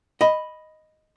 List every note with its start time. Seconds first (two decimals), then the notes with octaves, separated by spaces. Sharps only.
0.21 D#5 B5